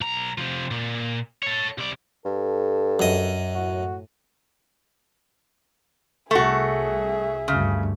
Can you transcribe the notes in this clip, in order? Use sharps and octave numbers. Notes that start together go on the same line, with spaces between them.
B1 A#5
C3 F3
A#2
A4 C#5
C3 D5
G2 A4
F#2 D#5
A2 F#4
C2 A3 F#4 G#4 E5
D2 G2 C#3